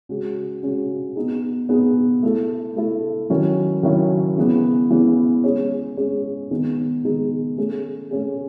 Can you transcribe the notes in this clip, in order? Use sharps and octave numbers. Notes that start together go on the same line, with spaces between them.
C#3 G#3 C#4 F#4
C#3 G#3 C#4 F#4
B3 D#4 G#4
B3 D#4 G#4
A3 E4 A4
A3 E4 A4
D#3 F#3 C#4 E4
D#3 F#3 C#4 E4
C#3 E3 B3
C#3 E3 B3
G#3 C#4 G#4 C#5
G#3 C#4 G#4 C#5
D#3 G#3 B3 D#4 G#4
D#3 G#3 B3 D#4 G#4
A3 C#4 G#4
A3 C#4 G#4